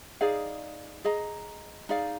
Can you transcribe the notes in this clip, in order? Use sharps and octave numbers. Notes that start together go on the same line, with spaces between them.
D#4 G#4 D5 F5
G#4 D#5 A#5
D#4 G#4 D5 F5